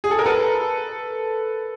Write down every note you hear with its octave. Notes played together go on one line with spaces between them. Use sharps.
G#4
A4
A#4
A4 B4